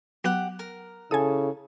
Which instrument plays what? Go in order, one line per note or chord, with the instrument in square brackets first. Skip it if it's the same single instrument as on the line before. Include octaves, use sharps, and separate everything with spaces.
[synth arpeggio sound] F#3 B3 F#6 [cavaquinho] G4 F#5
[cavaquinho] A#4
[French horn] C#3 [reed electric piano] E4 A4 [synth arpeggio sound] G#5 D#6